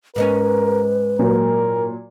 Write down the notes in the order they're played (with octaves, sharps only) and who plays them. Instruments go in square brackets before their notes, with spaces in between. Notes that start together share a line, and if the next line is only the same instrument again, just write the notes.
[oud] G#2 G#3 C#4 [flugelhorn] A#4 [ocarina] B4
[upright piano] A#2 F#3 [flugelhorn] A#4